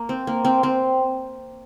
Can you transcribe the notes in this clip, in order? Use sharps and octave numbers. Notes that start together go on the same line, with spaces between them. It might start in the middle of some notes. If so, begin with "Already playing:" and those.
Already playing: A#3
C4
A#3
C4
C4